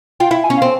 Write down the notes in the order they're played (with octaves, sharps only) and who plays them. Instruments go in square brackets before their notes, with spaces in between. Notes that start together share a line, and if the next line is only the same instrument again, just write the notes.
[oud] F4 [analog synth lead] G5
[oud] E4 [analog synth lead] F5
[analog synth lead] G#5
[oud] C#4
[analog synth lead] F5
[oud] C4